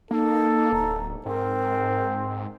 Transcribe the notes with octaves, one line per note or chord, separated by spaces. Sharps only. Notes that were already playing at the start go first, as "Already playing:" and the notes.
A#3 D#4 A4
D1 A#5
G#2 C4 A#4